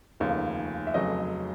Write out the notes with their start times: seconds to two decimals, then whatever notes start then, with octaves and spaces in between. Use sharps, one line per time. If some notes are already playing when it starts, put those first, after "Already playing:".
0.20 F1 D#2 C#3 F3
0.87 E5
0.94 F1 F2 C#3 F#3 D#5